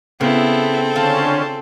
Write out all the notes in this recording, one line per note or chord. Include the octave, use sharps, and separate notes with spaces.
C#3 B3 C4 E4 A4
D3 C#4 F4 C5 A5